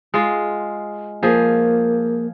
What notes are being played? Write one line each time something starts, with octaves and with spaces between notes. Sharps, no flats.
G#3 F4
F3 A#3 G#4